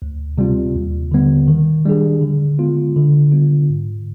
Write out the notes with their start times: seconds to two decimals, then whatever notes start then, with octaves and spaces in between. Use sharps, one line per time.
0.02 D2
0.38 C3 G3 C4 F4
0.76 D#2
1.11 D3 G3 B3
1.48 D#3
1.85 G3 D4 G#4
2.21 D3
2.58 G#3 B3 F4
2.96 D3
3.32 G3 B3 F4
3.69 G#2